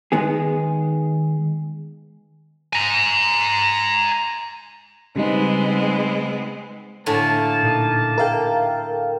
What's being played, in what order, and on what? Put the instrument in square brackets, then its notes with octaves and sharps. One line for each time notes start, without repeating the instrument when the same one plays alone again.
[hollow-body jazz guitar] D#3 G#3 B3 G#4
[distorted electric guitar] G#5 A#5
[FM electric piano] C#3 G3 D#4 [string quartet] G#3 B3 C4
[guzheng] A2 D3 G#5 [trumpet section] A#3 A5
[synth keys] A#2 D#4 D#7
[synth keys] A4 E5 [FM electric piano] A#4 F5 G5